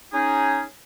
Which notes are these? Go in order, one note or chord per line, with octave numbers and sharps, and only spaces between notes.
C#4 D#4 G#4